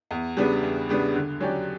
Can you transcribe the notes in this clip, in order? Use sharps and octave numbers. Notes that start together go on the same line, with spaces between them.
E2
C#3 G3 B3 D4
E2
C#3 G3 B3 D4
D3
F#3 C#4 G4 D5